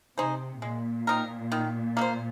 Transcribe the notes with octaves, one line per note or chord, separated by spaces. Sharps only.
C3 D#4 G#4 C5
A#2 G#3
C4 D#4 A#4
D#3
A#3 D#4 C5